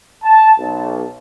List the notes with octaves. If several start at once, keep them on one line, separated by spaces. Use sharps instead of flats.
A5
B1